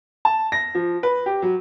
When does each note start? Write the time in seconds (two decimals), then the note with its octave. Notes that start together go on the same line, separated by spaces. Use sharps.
0.25 A5
0.52 A#6
0.75 F3
1.03 B4
1.26 G4
1.42 F#3